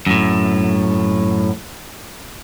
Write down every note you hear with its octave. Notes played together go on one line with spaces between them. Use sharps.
F#2 A2